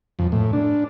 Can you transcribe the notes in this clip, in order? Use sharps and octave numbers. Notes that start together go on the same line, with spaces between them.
F2
A2
D4